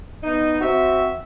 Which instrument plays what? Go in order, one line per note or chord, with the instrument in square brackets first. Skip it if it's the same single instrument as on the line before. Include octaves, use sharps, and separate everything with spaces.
[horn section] B3 D#4
C4 F#4 E5